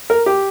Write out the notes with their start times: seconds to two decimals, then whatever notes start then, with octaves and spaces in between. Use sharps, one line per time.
0.10 A#4
0.26 G4